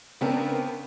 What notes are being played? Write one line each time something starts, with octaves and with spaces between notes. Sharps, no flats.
C#3 B3 C4 D4 A#4